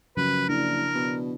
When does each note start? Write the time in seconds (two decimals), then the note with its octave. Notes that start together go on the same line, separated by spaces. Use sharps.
0.17 F#2 C#3 F3 B4
0.49 F#1 D4 E4 A#4
0.95 B2